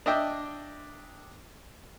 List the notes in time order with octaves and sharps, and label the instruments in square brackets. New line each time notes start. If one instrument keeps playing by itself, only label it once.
[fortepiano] D4 D#5 E5 G5 D6